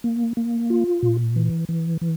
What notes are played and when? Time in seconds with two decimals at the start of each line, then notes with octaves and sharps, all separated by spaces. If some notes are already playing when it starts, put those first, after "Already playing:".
0.04 A#3
0.37 A#3
0.70 F4
1.03 A#2
1.36 E3
1.69 E3
2.01 E3